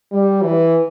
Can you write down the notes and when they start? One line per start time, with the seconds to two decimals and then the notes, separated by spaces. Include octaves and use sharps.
0.12 G3
0.42 E3